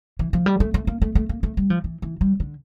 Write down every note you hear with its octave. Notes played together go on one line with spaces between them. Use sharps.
E3
F3
G3
A3
A3
A#3
A3
A3
A#3
A3
G3
F3
E3
E3
G3
D3